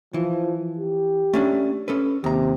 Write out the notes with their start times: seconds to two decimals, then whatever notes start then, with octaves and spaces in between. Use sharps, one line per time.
0.14 E3 F3
0.78 G4
1.34 A3 C#4 D4
1.88 C#4 A4 B4
2.24 D#2 C3 A#5